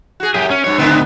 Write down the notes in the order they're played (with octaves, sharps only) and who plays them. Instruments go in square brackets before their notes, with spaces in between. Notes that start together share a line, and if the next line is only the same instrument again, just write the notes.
[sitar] F#4 G#4
[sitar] F#2 [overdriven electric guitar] G4 G#4
[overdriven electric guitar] C#4
[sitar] G2 B2 [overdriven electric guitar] C#5
[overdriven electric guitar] D2 C4 [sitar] D3 D#3 B3